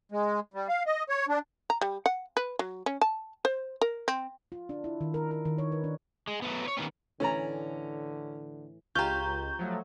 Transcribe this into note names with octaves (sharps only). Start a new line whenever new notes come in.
G#3
G3
F5
D#5
C#5
D4
A#5
G3
F#5
B4
F#3
C#4
A5
C5
A#4
C4
F4
D4
E4
D#3
A#4
A#4
D#3
C#5
B4
D4
G#3
F#3 A3 B3
B4 C#5
D#3 A#3 B3 C#4
A2 D3 E3 C#4 D5 A#5
C#2 F4 G4 A#5 C#6 G6
F3 F#3 A3